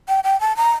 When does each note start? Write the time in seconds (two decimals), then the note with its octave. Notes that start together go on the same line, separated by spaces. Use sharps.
0.08 G5
0.24 G5
0.41 A5
0.57 A#5